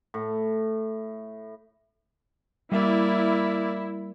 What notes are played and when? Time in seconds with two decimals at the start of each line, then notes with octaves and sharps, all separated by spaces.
0.14 A2
2.72 G3 A#3 E4 D5 E5